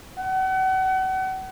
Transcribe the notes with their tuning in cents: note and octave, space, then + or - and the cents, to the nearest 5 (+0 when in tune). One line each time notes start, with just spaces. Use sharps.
F#5 +35